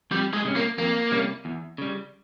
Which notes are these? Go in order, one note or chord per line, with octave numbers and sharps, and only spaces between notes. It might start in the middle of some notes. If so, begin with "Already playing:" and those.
F2 G3
G#3
C3 G3 C#4
A#3
F2 A#3
C3 G3 C#4
E2
C#3 G3